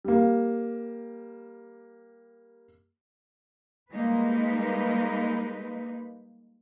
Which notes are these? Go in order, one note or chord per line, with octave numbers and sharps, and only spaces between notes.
G3 A#3
G3 G#3 A#3 D#4 B4